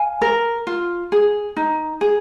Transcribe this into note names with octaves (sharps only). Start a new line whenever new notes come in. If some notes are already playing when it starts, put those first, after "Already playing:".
Already playing: F5 G#5
A#4
F4
G#4
D#4
G#4